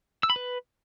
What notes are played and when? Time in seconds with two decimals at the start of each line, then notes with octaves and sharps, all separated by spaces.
0.23 E6
0.30 B5
0.36 B4